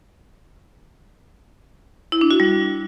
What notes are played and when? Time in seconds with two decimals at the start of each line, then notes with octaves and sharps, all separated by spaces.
2.12 E4
2.21 D4
2.31 F#4
2.40 G3